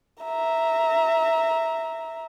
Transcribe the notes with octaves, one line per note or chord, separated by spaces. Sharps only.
E5 A#5